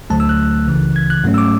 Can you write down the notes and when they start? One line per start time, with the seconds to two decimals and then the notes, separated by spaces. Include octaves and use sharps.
0.10 D2 D3 F#3 A3 A5
0.20 E6
0.29 F#6
0.67 C#2 C#3 E3
0.96 G#6
1.10 F#6
1.24 G#2 F#3 A3 C#4
1.34 E6
1.38 D6